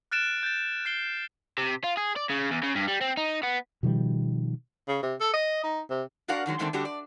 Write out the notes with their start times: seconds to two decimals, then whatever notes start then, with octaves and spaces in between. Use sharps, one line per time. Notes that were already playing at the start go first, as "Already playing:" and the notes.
0.11 F6 F#6 A6 D7 E7
0.43 G6 A6
0.85 F#6 C7 D7 G7
1.58 C3
1.84 F4
1.97 G#4
2.16 D5
2.29 C#3
2.51 E2
2.63 C#3
2.75 G2
2.88 G3
3.01 C4
3.17 D#4
3.43 B3
3.83 B2 D#3 F3 G3
4.88 C#3
5.03 C3
5.20 A4
5.33 D#5
5.64 D#4
5.90 C3
6.28 D4 F#4 A#4 D5 F5 F#5
6.46 D3 D#3 F#3 G#3
6.59 D3 D#3 G#3 A3 C4 D4
6.73 D3 G3 D4 F#4 G4
6.85 D5